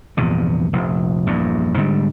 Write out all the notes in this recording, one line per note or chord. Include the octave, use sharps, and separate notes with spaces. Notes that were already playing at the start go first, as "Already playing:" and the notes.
A#1 E2 G2 C3
F1 A#1
A#1 E2 G2
G#2 D3 G3